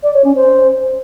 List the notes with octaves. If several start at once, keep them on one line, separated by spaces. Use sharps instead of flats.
D5
C#5
C#4
C5